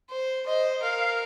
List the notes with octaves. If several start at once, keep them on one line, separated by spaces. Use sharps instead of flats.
C5
C5 D#5
A#4 F5